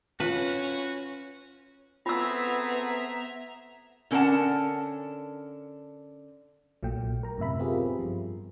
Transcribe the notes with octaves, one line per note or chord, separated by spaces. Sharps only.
C#4 F4 F#4 B4
A3 B3 C4 F4 G#4 E5 A#5 E6
D3 C#4 A#4 C5 F#5 A5
B1 A#2 F#3 A3 G5
A#4 A#5
F#2 A2 C3 E5 B5
B3 C4 F4 G4 G#4 A#4
G2 F3